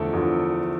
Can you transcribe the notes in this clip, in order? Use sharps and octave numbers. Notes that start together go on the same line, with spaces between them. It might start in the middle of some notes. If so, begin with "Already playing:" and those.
Already playing: E2 D3 F3 A3 A4
E2 D3 F3